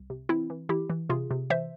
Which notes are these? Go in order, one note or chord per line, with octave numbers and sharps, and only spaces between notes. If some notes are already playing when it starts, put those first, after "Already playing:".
Already playing: C2
C3
E3 C4 E4
E3
E3 E4 G4
E3
C3 F4 G#4
C3
E3 C5 E5